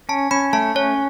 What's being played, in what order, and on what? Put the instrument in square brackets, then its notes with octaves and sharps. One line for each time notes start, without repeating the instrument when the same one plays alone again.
[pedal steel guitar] C#4 [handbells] A5
[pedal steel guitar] C#4 [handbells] B5
[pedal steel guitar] A3 [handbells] A5
[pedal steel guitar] C#4 [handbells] C#5